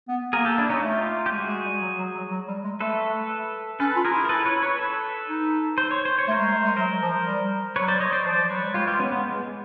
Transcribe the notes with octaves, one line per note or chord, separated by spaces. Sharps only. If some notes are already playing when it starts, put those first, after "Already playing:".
B3
A#3 G#4 A#4
G4 A4
D4 E4
C#4 D#4
A3 F4 G4
G4
G#3 F#4 G#4
G#3
G3
F#3
F#3
F#3
F#3
G3
G#3
A3 A4 B4
C#4 A4 B4
F4
G#4 A#4
E4
A#4
A4 B4
B4 C#5
B4 C#5
A4 B4
D#4
C5
C#5
C5
C#5
A3
A#4 C5
G#3
A3
G#3
F#3 A#4 C5
F3
G3
F#3 B4 C#5
C5 D5
C#5 D#5
C5 D5
F3 C5 D5
F3
F#3 B4 C#5
G3
G#3 F4 G4
F4 G4
B3 C#4
B3
G#3